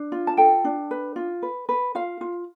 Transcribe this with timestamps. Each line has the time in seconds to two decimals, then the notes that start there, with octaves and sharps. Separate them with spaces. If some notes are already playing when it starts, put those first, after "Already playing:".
Already playing: D4
0.12 F4
0.27 A5
0.37 A4 G5
0.65 D4
0.91 B4
1.16 F4
1.42 B4
1.69 B4
1.95 F4 F5
2.21 F4